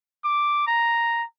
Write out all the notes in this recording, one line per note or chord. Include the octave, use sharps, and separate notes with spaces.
D6
A#5